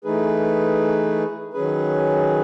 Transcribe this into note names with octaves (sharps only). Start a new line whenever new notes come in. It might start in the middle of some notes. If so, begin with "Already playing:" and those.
E3 A3 D#4 G#4 B4
D#3 F#3 C#4 G#4 B4